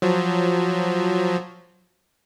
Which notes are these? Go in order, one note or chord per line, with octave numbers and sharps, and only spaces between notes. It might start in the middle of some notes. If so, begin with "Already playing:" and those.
F3 F#3